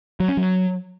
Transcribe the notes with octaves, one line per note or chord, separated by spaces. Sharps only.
F#3
C#4
F#3